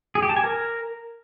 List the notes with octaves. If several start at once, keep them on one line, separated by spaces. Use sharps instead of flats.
G#4
G4
A5
G#5
A#4